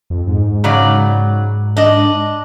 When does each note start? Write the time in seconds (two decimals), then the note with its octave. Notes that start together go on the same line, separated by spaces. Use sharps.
0.10 F2
0.27 G#2
0.64 C#3 F#3 D5
1.77 D4 D#5